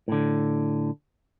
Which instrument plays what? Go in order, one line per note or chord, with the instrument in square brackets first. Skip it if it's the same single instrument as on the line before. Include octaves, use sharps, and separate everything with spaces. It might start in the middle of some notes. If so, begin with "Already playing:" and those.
[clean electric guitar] A2 D3